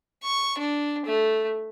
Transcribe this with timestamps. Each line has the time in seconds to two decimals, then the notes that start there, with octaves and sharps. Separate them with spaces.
0.23 C#6
0.58 D4
1.06 A3